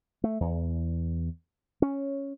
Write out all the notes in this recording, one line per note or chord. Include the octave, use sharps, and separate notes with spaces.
A3
E2
C#4